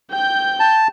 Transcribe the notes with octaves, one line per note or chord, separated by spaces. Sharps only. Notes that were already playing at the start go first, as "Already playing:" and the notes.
G5 G6
A5